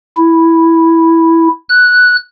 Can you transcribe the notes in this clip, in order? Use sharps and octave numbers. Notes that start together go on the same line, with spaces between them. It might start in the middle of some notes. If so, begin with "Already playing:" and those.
E4
F#6